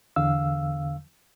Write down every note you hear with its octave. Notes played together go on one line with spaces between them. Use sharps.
E2 D3 F5 E6